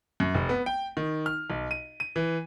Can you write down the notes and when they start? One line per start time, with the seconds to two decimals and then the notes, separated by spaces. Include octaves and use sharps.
0.20 F#2
0.34 F1
0.49 B3
0.66 G5
0.97 D#3
1.26 F6
1.50 B1
1.71 D#7
2.00 D#7
2.16 E3